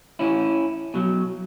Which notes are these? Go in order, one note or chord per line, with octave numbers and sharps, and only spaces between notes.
A2 E3 C#4 E4
B2 F#3